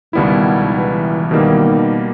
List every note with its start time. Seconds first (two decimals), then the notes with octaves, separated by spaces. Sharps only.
0.13 C#2 B2 D#3 G3 B3 E4
0.73 E3
1.31 B2 D#3 G3 A#3